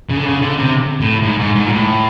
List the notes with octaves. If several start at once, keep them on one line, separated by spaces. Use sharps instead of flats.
C#3
D3
C#3
D3
C3
A2
G#2
G#2
G#2
A#2
A2